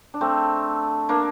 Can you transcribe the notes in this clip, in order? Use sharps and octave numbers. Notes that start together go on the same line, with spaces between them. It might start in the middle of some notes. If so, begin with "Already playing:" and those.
D4
A3 C4
A#3 D4